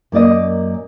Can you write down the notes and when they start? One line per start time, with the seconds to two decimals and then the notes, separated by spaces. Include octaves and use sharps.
0.12 F#2 A#3 D5 D#5